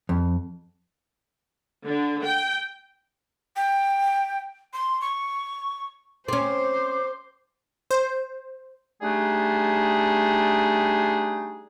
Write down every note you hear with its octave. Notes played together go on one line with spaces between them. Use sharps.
F2
D3
G5
G5
C6
C#6
C4 C#4 C5 D6
C5
G3 A3 D4 D#4 G#4